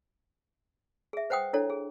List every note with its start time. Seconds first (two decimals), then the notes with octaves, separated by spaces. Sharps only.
1.13 G#4 E5
1.30 B4 C5 F#5 G5 D#6
1.53 D4 E4 A4 C#5
1.70 G#4